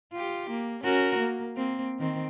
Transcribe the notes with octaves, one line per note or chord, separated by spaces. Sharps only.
F4 G4
A#3
C#4 F#4 A#4
A#3
A#3 C4
D#3 C4